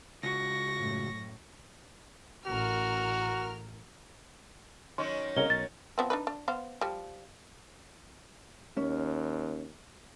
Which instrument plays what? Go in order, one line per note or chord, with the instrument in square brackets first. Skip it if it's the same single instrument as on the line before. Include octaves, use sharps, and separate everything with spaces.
[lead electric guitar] C#2 F#4 [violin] C#6 A#6
[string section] F#2 A2
[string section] A1 A#4 F6 [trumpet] F#4
[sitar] D#3 F#3 C#4 [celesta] C6
[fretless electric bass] C2 C#3 [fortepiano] A#4 C#5 D#5 [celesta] G7
[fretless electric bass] B1 [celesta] A6
[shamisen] F3 B3 C4
D4 D#4 B4
D4
B3 C5 F5
F3 G3
[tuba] D#2 [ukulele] C#4